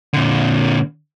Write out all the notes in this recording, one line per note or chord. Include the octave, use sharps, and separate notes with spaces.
A#2 D3